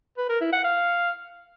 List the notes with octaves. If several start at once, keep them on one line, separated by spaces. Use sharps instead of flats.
B4
A#4
E4
F#5
F5